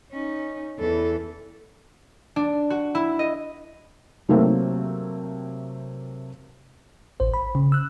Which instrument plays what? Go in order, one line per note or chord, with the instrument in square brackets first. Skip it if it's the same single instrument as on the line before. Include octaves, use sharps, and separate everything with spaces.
[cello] C#4 D#4
[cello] E2 E3 [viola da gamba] A4
[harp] D4
F#4
E4
D#5
[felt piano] C3 F#3 A3 A#3 C4
[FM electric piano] A1 C5
B5
C#3
E6 F#6